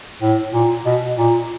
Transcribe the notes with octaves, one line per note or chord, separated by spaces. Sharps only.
A2
A#2
B2
A#2